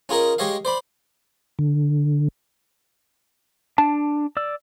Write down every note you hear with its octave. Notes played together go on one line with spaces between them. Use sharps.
C#4 F4 G#4 A#4 D#5
G#3 G4 C#5 D#5 F5
C5 D5 B5
D3
D4 A5
D5 E6